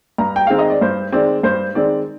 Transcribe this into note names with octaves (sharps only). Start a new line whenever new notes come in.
G2 A#5
G5
D#3 G#3 C4 F5
D#5
D5
G2 C5
D#3 G#3 C4 D5
G2 C5
D#3 G#3 C4 D5